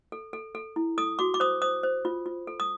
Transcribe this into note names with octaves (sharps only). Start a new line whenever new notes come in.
A4
A4
A4
E4
A4 D#6
F#4 D6
D6
C5 D#6
C5 D#6
C5
F4
F4
A4
D#6